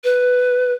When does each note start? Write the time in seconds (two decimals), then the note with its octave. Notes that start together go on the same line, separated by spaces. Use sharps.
0.04 B4